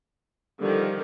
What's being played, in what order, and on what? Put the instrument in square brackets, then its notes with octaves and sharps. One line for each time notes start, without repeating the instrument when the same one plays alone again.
[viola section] D3 D#3 F3 [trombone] G3